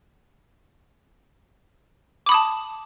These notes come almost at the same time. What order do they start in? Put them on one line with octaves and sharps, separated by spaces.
D6 B5 D#6 A5